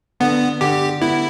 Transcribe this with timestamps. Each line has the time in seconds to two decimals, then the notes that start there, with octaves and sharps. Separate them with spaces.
0.20 D3 B3
0.61 D3 G4
1.01 B3 E4